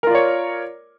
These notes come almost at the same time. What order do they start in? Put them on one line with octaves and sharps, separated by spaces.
A#4 F4 D5 C#5